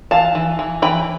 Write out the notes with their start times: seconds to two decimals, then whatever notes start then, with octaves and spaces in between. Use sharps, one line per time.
0.11 E3 F5 A5
0.35 E3
0.59 E3
0.82 E3 G5 B5